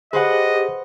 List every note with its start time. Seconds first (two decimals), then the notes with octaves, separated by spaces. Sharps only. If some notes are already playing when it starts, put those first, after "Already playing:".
0.13 G4 G#4 B4 C5 D#5 F#5